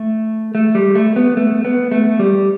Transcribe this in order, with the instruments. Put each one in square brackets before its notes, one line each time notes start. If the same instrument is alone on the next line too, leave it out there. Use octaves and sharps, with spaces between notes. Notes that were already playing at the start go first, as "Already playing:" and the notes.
Already playing: [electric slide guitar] A3
A3
G3
A3
B3
A3
B3
A3
G3